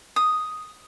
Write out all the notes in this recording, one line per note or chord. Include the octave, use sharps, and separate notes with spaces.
D#6